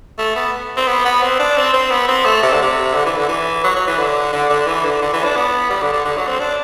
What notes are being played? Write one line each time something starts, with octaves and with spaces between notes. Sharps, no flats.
A3
B3
C4
B3
B3
C4
D4
C4
C4
B3
C4
A3
C3
D3
C3
D3
E3
D3
E3
F#3
F#3
E3
D3
D3
D3
E3
D3
D3
E3
D4
B3
G3
D3
D3
D3
F#3
C4
D4